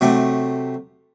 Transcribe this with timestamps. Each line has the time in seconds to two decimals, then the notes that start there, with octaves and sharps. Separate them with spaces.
0.01 C3 F#3 A3